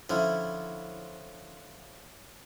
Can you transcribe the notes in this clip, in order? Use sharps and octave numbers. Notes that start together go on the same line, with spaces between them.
D3 F3 C#4 E4